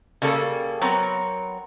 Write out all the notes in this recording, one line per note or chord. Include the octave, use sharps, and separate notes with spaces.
C#3 G3 A#3 A4
F#3 B3 C4 A#4 C#5